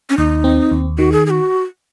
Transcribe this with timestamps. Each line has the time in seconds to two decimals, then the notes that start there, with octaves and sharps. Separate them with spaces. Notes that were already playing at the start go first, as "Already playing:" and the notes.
0.10 C#4
0.18 D#2 D#4
0.44 C4
0.71 D#2
0.98 D#3 F#4
1.12 G#4
1.26 G#4
1.30 F#4